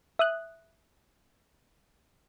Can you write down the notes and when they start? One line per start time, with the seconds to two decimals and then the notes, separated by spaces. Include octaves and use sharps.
0.19 E5 D#6 F#6